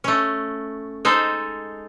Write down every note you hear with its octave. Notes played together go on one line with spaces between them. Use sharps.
A3 C#4
G#3 D#4 A4 C5